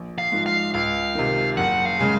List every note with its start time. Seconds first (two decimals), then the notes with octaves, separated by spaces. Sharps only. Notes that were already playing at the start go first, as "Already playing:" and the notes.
Already playing: A#1
0.18 F5
0.32 G#2 F3
0.46 F5
0.74 C#2 F5
1.15 C3 D#3
1.57 F#1 F#5
1.85 F5
1.99 C#3 G#3